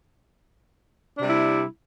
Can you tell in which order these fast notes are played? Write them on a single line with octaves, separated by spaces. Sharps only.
D4 C3 G3 E4